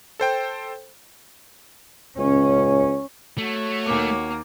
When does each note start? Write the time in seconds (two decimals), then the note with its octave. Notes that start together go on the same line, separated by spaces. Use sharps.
0.20 A4 C5 G5
2.18 C#2 C#4
3.38 A3 F#4 C#5
3.86 D#2 A#3 D6